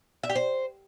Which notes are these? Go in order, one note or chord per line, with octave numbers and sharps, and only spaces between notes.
E5
G4
C5